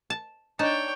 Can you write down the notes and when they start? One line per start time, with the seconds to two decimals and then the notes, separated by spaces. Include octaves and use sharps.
0.10 A5
0.59 D4 D#4 C#5 G5 A5